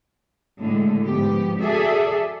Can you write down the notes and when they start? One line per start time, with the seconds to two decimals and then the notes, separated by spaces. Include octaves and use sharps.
0.60 A2 D3 G#3
1.07 G#2 F3 B3 G4
1.60 F#4 G#4 A4 D5 E5